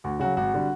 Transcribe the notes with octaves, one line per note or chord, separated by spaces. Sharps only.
D2 F#4
C#3 F#3 F#4
G#1 F#4
D3 G3